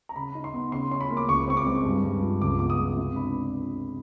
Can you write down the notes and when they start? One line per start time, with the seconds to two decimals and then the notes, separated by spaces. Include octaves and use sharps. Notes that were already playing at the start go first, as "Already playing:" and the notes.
0.09 A#5
0.16 C#3 B5
0.35 D#4
0.44 C6
0.54 B3
0.72 C#3 C6
0.91 C#4 C6
1.01 B5
1.10 A#3
1.17 D6
1.28 C#2 C#6
1.48 C4 C#6
1.57 D6
1.66 G#3
1.85 G2
2.04 G2
2.22 F3
2.41 C#2 D6
2.59 B3 D6
2.70 D#6
2.79 G#3
2.97 C3
3.16 D4 B5